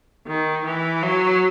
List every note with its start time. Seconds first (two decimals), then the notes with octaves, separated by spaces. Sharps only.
0.27 D#3
0.66 E3
1.03 F#3